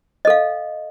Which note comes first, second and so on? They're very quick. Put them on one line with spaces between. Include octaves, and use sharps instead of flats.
D#5 A4 F5